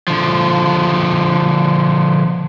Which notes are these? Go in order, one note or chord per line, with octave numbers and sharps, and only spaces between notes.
D3 F3